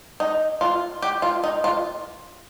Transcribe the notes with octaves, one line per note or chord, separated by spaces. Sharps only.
D#4
F4
G4
F4
D#4
F4